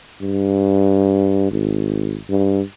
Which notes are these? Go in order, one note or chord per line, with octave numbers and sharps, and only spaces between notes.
G2
G#1
G2